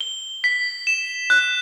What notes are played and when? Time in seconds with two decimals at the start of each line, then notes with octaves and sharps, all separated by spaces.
0.01 G7
0.44 B6
0.87 E7
1.30 F#6